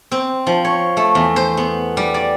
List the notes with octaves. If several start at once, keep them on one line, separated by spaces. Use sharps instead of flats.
C4
F3
C#5
A3
E2
C5
B3
G3
D5